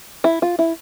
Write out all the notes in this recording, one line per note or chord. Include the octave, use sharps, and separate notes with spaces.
E4
F4
E4